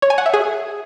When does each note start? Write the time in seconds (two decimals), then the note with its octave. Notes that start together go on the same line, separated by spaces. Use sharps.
0.02 C#5
0.10 G#5
0.18 F#5
0.26 E5
0.34 G#4